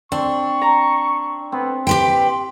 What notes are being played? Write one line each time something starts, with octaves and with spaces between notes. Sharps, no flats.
C4 D4 C#6
A#5
B3 C4
G4 B4 G5 C6